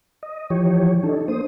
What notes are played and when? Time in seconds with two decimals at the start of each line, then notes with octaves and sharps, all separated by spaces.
0.23 D#5
0.50 E3 F3 G4 C#5
1.03 D4 D#4 A4
1.28 A#3 C5 D#6